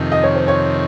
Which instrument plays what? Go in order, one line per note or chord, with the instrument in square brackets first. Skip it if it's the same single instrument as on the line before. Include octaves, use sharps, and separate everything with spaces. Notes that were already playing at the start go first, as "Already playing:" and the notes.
Already playing: [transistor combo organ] F2 C3 D#3
[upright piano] D#5
C#5
C5
C#5